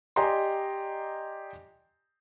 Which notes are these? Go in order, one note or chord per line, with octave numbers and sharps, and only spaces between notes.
G4 D5 D#5 G#5 A#5 C6